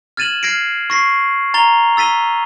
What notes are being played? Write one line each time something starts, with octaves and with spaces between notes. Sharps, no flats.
F6 G#6 A6 D#7 E7 F#7
F6 G#6 A#6 C7 D7
C#6 A#6 C7
A#5 A6 F7 G7
E6 A6 B6 D#7 G7